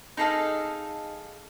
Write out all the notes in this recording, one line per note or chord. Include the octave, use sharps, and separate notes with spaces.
D#4 G#4 A4 F5